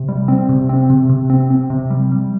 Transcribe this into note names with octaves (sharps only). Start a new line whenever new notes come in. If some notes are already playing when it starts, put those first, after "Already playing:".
Already playing: C3
G3
C4
C3
C4
C3
C3
C4
C4
C3
G3
G3